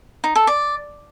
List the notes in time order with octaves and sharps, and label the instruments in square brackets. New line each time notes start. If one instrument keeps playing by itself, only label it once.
[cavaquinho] D#4
A4
D5